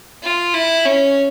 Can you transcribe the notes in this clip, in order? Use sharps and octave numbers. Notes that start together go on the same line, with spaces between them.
F4
E4
C#4